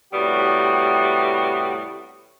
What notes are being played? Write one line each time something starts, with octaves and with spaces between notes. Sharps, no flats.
A2 C3 G3 B3 F#4 G4